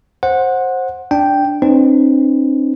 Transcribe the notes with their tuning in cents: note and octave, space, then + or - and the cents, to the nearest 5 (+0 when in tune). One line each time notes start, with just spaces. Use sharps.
C5 +15 F#5 -15
D4 +0 G5 +0
C4 +30 D#4 -45 B4 +35